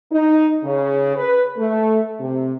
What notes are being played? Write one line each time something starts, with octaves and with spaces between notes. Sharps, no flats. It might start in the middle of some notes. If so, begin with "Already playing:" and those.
D#4
C#3
B4
A3
C3